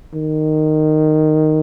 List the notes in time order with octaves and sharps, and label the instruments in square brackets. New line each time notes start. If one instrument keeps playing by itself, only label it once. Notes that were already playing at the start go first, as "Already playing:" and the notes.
[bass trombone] D#3